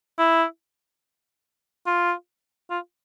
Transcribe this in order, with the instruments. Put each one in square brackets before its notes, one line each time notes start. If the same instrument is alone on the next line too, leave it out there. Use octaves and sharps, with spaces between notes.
[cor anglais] E4
F4
F4